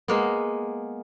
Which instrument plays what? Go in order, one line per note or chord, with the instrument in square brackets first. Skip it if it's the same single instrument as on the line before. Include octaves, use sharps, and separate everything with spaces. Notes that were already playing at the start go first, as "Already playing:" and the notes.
[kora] G#3 A#3 B3